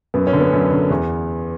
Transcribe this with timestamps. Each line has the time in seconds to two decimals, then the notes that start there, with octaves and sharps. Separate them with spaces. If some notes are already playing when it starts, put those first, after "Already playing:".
0.14 F#2 B3
0.27 C#4
0.33 D3
0.40 B3
0.53 F#2
0.71 D3
0.90 E2